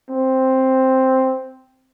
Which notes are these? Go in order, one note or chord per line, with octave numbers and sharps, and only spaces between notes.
C4